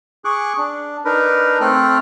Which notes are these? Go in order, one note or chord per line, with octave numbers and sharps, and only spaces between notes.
G#4 C#6 D6 F#6
D4
D4 D#4 A#4 B4
A3 C4 A4 G5 F6 F#6